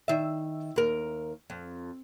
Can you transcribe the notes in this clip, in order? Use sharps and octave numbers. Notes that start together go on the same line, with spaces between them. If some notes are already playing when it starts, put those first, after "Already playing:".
D#3 E5
D#2 A#4
F2